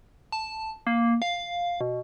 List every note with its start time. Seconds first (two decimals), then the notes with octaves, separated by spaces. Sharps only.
0.32 A5
0.87 A#3
1.22 F5
1.81 B2